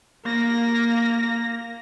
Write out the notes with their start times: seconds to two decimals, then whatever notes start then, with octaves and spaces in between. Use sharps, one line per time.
0.25 A#3 A#6